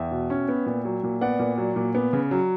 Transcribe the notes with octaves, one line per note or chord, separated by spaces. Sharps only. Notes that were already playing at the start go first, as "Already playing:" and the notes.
Already playing: E2 E5 G5
B2
C#4
B3
A#2
F#3
A#2
B3 D5 F#5
A#2
F#3
A#2
B3
C#3
F#3